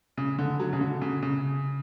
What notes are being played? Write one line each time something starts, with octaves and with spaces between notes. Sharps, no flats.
C#3
D3
F#3
C#3
D3
C#3
C#3